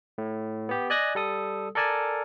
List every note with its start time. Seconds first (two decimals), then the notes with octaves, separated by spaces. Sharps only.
0.18 A2
0.69 B3 G4
0.90 D5 D#5 G#5 F#6 G#6 A#6
1.15 G3 A4 D#6
1.75 A4 A#4 D5 G#5 A5